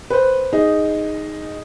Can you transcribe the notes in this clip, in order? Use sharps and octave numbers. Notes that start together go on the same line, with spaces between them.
B4 C5
D#4 G#4